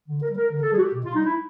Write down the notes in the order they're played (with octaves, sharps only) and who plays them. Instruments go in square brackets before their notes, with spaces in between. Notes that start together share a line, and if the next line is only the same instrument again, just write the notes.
[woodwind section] D3
A#4
G3
A#4
D3 A#4
A4
G3 G#4
F#4
G4
B2
F4
G3 D#4
E4